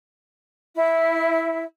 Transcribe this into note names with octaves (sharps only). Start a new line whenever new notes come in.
E4